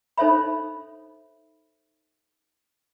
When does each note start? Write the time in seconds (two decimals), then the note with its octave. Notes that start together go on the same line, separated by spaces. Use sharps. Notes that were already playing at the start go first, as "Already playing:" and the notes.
0.17 D#4 A4 C5 C#5 E5 B5